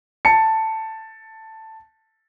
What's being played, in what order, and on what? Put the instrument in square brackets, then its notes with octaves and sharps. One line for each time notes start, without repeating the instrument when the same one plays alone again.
[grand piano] A5 C#7